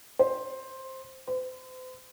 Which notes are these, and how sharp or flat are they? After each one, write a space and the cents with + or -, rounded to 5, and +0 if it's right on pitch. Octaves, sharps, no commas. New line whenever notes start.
C5 +10
C5 -40